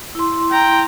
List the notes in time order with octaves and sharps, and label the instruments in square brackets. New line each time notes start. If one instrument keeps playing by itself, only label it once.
[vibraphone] E4 C6
[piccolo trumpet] G5 [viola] A#5